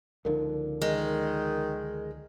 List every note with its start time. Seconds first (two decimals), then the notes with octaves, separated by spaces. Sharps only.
0.25 C#2 D3 F3 D#4 A#4
0.82 D#3 G#3